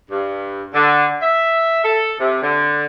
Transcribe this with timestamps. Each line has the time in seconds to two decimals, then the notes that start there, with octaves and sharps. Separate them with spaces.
0.10 G2
0.74 D3
1.22 E5
1.84 A4
2.20 C3
2.42 D3